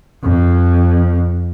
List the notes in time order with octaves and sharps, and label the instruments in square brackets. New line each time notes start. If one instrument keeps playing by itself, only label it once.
[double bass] F2